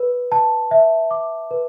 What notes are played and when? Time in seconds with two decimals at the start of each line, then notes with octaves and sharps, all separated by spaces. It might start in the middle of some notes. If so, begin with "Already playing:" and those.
Already playing: B4
0.32 A5
0.71 E5
1.11 D6
1.51 B4